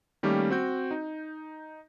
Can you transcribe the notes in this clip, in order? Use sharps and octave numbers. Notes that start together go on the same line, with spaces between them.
D#3 G3 A3 A#3 C#4 G4
C4 F#4 G6
D#4